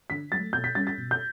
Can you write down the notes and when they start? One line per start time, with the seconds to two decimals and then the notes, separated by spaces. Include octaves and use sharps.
0.10 D3 B6
0.32 F#3 A3 A6
0.53 B2 G6
0.64 B6
0.75 G3 C#4 A6
0.87 A6
0.98 B2
1.11 G6